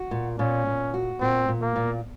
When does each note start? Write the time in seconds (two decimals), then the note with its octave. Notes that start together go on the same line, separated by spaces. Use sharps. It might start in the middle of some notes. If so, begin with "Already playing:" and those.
Already playing: F#4
0.11 A#2
0.39 A#2 C#4
0.66 A#2
0.94 F#4
1.21 A#2 C4
1.48 A#2
1.62 A#3
1.76 A#2